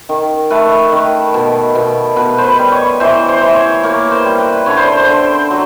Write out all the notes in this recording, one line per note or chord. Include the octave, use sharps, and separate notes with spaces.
D#3
A3 B4
D#3
B2
B2
B2 B4
C5
B4
G3
C#5
E3 C5
C5
E3
C#5
A#3 C#5
C5
G3
B4
D3 C#5
C5
B4
C5
D3
F#3